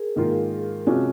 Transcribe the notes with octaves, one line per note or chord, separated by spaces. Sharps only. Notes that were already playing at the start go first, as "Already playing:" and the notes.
Already playing: G#4 A#4
G#2 D#3 A#3 F4
C3 F3 G#3 C#4 F#4